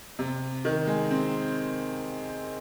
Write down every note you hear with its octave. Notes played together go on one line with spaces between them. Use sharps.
C3
D#3
G#3
C4